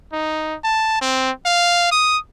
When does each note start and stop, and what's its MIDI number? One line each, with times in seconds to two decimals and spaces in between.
0.12 0.55 63
0.64 0.96 81
1.01 1.30 60
1.45 1.90 77
1.91 2.17 87